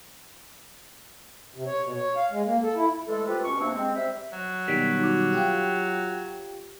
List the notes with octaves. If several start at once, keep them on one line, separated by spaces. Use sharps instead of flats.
C3
C#5
B2
C#5
F5
G#3
A#3
A4
E4
E3 G#3 A3 A4
C4 F4 G4 A4 B4
B2 C#4 C#6
C3 A#3 C4 D4
G#3 C4
G3 C5 E5
F#3
B2 D#3 G3 B6 D7
D#4 F#4 D6
F4 G4 G5